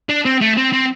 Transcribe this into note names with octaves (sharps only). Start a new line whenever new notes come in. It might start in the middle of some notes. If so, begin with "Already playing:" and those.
D4
C4
A3
C4
C4